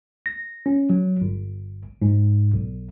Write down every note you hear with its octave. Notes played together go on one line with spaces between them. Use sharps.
A#6
C#4
F#3
G1
G#2
B1